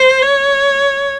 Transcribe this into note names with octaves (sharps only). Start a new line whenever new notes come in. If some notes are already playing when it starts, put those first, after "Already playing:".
Already playing: C5
C#5